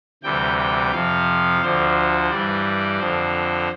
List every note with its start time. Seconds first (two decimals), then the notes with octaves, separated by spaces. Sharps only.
0.23 D2 C3 E3 G3 G5
0.58 G5
0.92 F2 C3 F3 F5
1.61 D2 D3 F3 C5
2.30 G2 E3 G3 D5
2.99 F2 D3 F3 C5